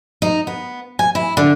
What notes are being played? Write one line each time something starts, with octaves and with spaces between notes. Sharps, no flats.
D#4
B3
G#5
E4
D3